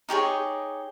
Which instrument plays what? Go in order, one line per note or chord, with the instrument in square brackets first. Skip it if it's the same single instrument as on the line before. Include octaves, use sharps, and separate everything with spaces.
[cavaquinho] D#4 G4 G#4 C#5